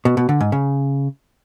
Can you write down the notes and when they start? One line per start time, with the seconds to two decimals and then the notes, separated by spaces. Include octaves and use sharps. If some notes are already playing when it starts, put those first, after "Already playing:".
0.05 B2
0.17 B2
0.29 D3
0.41 G#2
0.52 C#3